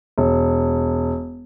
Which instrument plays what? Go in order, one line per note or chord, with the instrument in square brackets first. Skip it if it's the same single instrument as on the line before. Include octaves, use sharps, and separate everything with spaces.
[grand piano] E1